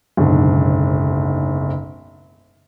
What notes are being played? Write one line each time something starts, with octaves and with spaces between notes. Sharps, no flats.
F#1 B1 G#2 D3